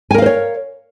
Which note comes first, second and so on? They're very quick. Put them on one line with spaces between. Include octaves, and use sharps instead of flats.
G#5 A#4 F5 C5 C#5